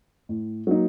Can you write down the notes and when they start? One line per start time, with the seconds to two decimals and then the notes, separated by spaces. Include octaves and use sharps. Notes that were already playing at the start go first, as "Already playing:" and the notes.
0.29 A2
0.67 F#3 A#3 D#4